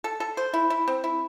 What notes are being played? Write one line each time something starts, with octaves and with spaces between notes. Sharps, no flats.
A4
A4
C5
E4
E4
C4
E4